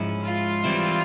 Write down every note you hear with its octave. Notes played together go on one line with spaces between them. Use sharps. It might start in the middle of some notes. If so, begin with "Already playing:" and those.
Already playing: G#2 F3 G#3 C#4 E4
F4
E3 G3 C4 E4